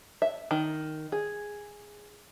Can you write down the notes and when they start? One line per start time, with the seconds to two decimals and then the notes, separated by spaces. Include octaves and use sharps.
0.22 E5
0.51 D#3
1.12 G#4